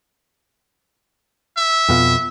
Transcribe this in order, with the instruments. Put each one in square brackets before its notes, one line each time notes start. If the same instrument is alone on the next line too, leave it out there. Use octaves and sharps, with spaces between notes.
[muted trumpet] E5
[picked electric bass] F2 B2 F3